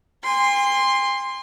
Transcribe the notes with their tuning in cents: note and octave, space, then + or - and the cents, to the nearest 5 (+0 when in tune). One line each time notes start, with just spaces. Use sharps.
G#5 -45 C6 +0